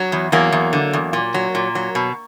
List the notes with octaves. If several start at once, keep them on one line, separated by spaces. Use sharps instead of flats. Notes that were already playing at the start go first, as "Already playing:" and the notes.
Already playing: F#3
E2
E2 F#3 A#3
E2
D3
E2
A#2
F#3
A#2
F#3
B2